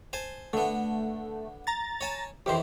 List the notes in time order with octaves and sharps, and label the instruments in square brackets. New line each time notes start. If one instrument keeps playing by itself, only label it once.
[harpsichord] C5 G#5 A5
[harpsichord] D3 B3 [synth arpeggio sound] A3
[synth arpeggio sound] A#5 A6
[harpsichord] C#5 G#5 A5
[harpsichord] F2 D#3 E3 [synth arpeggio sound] G4 C5